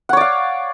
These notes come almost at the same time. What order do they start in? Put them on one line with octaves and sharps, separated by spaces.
F#5 C#5 D5 F5